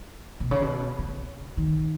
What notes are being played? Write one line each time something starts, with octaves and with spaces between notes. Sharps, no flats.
B2
C#3
B2
C#3
D#3